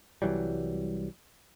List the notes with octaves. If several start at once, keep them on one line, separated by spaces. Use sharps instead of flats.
C2 E3 F#3 G3